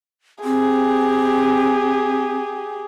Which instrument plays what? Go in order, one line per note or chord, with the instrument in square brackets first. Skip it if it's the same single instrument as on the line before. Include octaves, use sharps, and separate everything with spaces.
[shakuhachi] C4 [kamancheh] G4 G#4